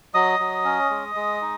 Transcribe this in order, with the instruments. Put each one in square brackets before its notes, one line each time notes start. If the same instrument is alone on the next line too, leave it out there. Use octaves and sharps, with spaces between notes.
[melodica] F#3 D#5 D#6
F#3
C#4
G#3
G#3
D#4